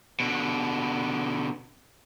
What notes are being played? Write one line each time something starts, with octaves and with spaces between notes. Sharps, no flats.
B2 D3